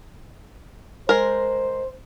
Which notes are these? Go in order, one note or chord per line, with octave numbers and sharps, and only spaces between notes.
G#3 A#4 C5